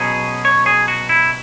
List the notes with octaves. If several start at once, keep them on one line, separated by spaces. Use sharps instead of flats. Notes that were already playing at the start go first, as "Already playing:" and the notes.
Already playing: B2 F#3 C#4 G#4
C#5
G#4
F#4
E4